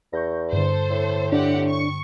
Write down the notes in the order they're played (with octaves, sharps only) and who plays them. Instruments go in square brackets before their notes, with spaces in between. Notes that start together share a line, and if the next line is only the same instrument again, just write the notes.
[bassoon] E2 [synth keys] C#6 G6 A#6
[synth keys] G2 D3 [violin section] A4 C5
[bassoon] A2
[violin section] C4 G4 F#5 [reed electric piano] D4
[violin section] C#6